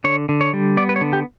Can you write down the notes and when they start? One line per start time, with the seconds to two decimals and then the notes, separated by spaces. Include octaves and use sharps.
0.04 D3 C#5
0.29 D3
0.41 C#5
0.53 G3
0.77 B3 D5
0.89 B4
0.96 C#5
1.01 D3
1.13 G4